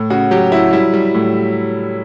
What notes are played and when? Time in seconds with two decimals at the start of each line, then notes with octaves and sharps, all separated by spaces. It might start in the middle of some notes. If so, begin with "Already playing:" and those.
Already playing: A2
0.10 C#3 F#4
0.31 F#3 G4
0.52 F#3 E4
0.73 G3 E4
0.94 G3
1.14 A2